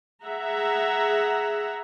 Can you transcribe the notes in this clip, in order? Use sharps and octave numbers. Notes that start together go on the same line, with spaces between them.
G#4 E5 F#5 A#5